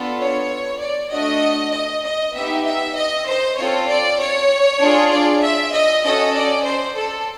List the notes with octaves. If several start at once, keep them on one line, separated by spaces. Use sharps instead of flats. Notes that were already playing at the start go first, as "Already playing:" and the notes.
Already playing: B3 D4 F4 A4
C#5
D5
A3 D4 F#4 D#5
D#5
D#5
B3 D#4 G4 E5
E5
D#5
C5
C4 F4 A4 C#5
D5
C#5
D4 F4 G#4
D5
E5
D#5
C#4 F#4 A4 D#5
D5
C5
A4